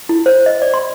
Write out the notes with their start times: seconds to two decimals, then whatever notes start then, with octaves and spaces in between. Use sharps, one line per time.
0.09 E4
0.26 C5
0.46 D#5
0.62 D5
0.74 C6